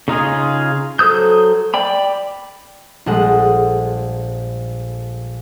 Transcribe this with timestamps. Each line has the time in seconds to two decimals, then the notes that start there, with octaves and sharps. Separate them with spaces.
0.08 C#3 D#4 F4 G#4
0.99 F#3 A4 C5 D#6 G6
1.74 D5 G5 B5
3.06 A#1 G3 G#3 A4 F#5 D#6